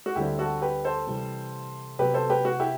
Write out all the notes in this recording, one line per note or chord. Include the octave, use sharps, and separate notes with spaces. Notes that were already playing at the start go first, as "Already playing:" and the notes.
F#4
D2 D3 G3 C4 E4 G4
F#4 A4
G4 B4
A4 C5
C3 E3 G3
C3 F#3 B3 G4 B4
A4 C5
G4 B4
F#4
E4 G4